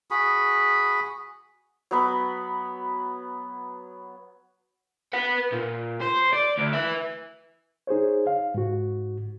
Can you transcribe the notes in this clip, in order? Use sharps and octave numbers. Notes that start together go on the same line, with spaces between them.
F#4 G#4 B5
F#3 B3 B5
B4 F#5
A#2
C5
D5
D2
B4 E5
D#4 G#4 C5 C#5
F5
G#2 F#4